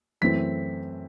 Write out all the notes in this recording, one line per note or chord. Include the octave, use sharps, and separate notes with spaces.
F#2 E3 A3 C4 B6